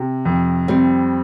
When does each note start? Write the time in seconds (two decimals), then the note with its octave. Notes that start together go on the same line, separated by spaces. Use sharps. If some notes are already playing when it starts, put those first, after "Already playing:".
Already playing: C3
0.25 F2
0.68 G3 C4